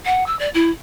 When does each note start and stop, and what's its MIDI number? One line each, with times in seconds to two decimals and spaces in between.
0.05 0.24 78
0.26 0.36 88
0.39 0.49 74
0.54 0.70 64